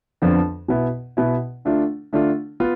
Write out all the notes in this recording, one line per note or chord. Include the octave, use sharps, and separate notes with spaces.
F2 D3 F3 B3 D4
B2 B3 E4
B2 B3 E4
D3 A3 D4 F4
D3 A3 D4 F4
B3 F4